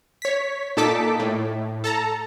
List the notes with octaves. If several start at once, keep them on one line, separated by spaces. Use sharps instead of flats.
C#5 B6
A#2 D#4 A4 A5 D6 B6
A2
A4 A5 A#5